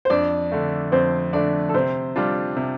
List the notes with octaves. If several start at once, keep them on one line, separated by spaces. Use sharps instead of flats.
C5
F2 D4 D5
D3 A3
F2 C4 C5
D3 A3 D4 D5
A4
C3 C4 C5
G3 D4 F4
C3